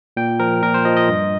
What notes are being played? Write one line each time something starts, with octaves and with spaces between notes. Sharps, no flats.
A#2 G5
F3 A#4
A#2 A#4
C5
F3 D#5
D#5
G2